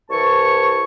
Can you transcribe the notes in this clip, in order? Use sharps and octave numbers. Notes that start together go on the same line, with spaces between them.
C2 E3 C#5 A5 C#6